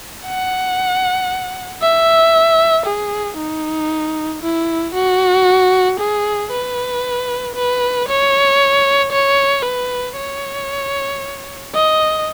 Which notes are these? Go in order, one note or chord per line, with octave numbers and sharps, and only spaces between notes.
F#5
E5
G#4
D#4
E4
F#4
G#4
B4
B4
C#5
C#5
B4
C#5
D#5